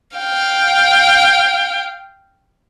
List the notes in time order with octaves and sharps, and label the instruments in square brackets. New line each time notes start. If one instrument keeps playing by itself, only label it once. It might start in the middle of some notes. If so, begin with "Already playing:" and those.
[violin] F5 G5